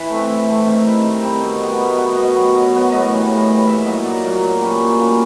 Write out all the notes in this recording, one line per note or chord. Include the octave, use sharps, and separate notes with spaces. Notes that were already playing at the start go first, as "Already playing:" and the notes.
Already playing: E3 E5
A3 C4
E3
A3 C4
D#3 E5
G3 C4
D#3
G3 C4
B2
G3 B3
B2
G3 B3
B2 D#5
F#3 B3
B2
F#3 B3
A2 D#5
E3 G3
A2
E3 G3
A#2 E5
F#3 A#3 D#5
A#2 D5
F#3 A#3
A#2
G3 A#3 C#4
A#2
G3 A#3 C#4